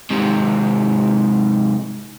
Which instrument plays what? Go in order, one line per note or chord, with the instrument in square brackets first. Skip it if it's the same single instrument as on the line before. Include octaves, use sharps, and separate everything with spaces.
[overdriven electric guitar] G#2 C3